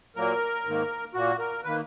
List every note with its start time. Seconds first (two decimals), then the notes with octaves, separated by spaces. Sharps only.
0.16 A#2 F#3 A#3 A#4
0.65 G#2 D#3 A#3
1.14 A#2 A#3 F#4
1.39 A#4
1.64 D#3 A#3 B4